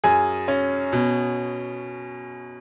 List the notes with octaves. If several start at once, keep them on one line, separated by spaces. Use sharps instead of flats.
F#2 G#4 G#5
C#4
B2